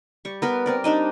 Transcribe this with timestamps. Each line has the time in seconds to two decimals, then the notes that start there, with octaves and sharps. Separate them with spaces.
0.25 G3 C#6
0.42 B3 A#4 B4
0.66 C4 A#4 D5
0.84 G3 D4 D#4 D#5